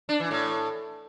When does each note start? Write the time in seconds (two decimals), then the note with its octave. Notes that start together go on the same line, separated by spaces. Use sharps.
0.09 D4
0.20 E3
0.31 A2